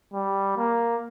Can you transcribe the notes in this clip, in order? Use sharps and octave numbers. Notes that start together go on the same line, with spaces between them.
G3
A#3